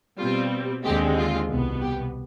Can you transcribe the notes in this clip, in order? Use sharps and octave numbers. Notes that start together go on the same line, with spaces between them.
B2 G3 C4 F4
D#2 D3 G#3 C4 G4
F4
C2 B2 B3
G4